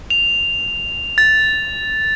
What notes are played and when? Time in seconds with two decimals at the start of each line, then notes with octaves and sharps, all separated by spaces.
0.10 F7
1.18 A6